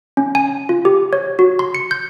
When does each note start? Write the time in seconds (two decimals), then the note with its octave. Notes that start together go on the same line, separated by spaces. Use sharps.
0.17 C#4
0.35 G#5
0.69 F4
0.85 G4
1.13 C#5
1.39 F#4
1.59 C6
1.75 C#7
1.91 G6